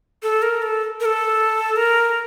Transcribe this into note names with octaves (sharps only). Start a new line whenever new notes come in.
A4
A#4
A4
A#4
A4
A#4